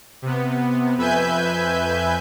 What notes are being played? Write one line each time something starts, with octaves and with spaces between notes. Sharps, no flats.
C3 B3
F2 B4 E5 G#5 G6